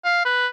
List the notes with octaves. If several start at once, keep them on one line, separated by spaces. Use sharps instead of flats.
F5
B4